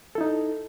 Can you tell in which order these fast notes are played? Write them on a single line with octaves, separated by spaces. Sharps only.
A4 E4 D#4